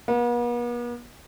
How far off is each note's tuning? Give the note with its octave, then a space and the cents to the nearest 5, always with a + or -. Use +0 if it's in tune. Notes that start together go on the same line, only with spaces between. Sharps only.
B3 -45